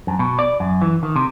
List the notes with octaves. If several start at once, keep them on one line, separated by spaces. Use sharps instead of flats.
F#2
B2
D5
F#2
E3
D#3
C3